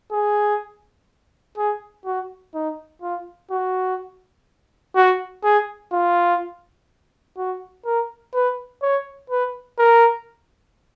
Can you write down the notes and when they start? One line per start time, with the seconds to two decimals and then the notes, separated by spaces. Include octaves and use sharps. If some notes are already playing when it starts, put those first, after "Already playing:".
0.12 G#4
1.58 G#4
2.05 F#4
2.55 D#4
3.02 F4
3.51 F#4
4.96 F#4
5.44 G#4
5.92 F4
7.37 F#4
7.85 A#4
8.34 B4
8.82 C#5
9.30 B4
9.78 A#4